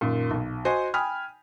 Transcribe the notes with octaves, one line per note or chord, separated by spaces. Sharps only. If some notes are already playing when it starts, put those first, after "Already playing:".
F#2 A#2 D#3
B1
F#4 C5 D#5 G#5
G5 G#5 B5 D#6 F6